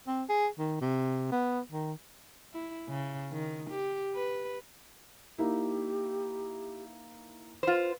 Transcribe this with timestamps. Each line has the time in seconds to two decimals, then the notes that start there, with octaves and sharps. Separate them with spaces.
0.08 C4
0.29 G#4
0.59 D#3
0.82 C3
1.32 B3
1.72 D#3
2.54 E4
2.89 C#3
3.32 D#3
3.70 G4
4.15 B4
5.38 A#3 D#4 E4 G4
7.63 F4 B4 C5